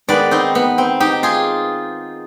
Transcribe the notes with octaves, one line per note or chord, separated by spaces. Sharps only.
D#3 G#3 B3 B4 D5
C4 D#4
B3
C4
D#4 G4
F4 G#4